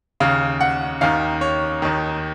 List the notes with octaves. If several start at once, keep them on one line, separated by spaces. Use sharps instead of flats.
D#2 C#3 F5
F#5
D#2 D#3 F5
C#5
D#2 D#3